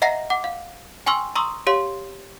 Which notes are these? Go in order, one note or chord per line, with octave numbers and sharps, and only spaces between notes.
D#5 E5 F#5 A#5 A#6 C7
F#5 D6
F5
G5 G#5 C6 C#6 E6 F6
A#5 C6 C#6 D#6 E6
G4 C#5 F5 C6